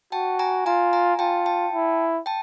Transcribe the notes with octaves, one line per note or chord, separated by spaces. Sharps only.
F#4 G5 A5
G#5 A#5
F4 G#5 A#5
G#5 A#5
F4 G5 A5
G5 A5
E4
G5 A5